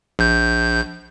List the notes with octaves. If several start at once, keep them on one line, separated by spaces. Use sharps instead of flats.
A#1 G6